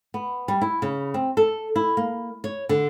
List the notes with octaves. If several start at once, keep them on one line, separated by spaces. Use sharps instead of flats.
B3
G3
E4
C#3
C4
A4
E4
A#3
C#5
D3